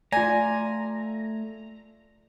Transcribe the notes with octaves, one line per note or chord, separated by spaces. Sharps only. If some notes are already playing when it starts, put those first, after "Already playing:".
A3 F4 D5 G#5 A#5